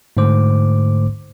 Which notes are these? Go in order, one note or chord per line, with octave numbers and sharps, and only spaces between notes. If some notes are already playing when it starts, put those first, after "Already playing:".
G#2 D3 A3 C5 D6